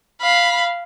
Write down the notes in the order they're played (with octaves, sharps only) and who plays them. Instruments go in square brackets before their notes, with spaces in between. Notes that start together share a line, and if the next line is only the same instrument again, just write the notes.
[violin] F5 B5